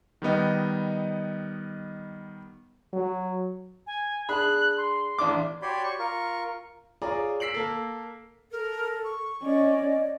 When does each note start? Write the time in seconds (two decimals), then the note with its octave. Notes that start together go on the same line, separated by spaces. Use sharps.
0.22 D#3 G3 B3 D#5
2.93 F#3
3.87 G#5
4.29 D4 G#4 B5 F#6
4.77 C6
5.18 A1 D4 D6
5.62 F#4 G4 C#5 D5 B5 C6
5.83 C#6
5.99 F4 A#4 C#6
7.02 F4 G#4 C#5 D5 A#5 D6
7.40 E6 B6 C7 D7 F#7
7.54 A#3 A4
8.52 A4 A#4
9.04 C#6
9.42 C#4 D5 D#5